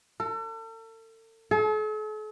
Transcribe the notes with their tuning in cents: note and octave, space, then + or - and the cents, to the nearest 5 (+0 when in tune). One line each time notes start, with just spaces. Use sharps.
A4 +40
A4 -45